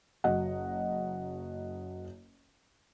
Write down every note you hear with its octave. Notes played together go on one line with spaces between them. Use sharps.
F#1 F#4 D#5 F#5